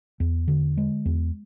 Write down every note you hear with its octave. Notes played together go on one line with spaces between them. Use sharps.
E2
D3
G#3
E2